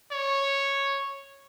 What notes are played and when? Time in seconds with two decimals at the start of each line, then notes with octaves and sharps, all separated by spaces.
0.12 C#5